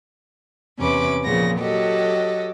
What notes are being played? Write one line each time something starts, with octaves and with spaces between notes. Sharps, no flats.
E2 C3 C#4 B4 D6
A#2 C#3 F3 B3 A#6
F#3 G4 A4 D#5